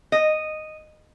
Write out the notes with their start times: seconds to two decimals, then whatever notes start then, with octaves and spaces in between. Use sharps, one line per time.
0.12 D#5